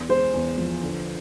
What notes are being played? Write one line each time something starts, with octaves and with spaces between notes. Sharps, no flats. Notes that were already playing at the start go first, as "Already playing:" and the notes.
Already playing: E2
G#3 C5
E2
F3
D3